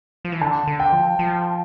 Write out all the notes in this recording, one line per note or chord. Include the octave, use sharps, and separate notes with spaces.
F3
E3
D3 A5
D3
G5
F3
F3